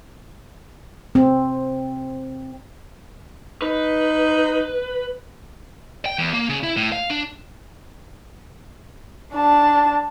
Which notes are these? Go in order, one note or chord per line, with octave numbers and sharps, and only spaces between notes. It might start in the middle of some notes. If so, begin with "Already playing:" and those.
C4
D#4 B4
G5
E2
A#3
C#3
E4
A2
F5
D4
D4 A5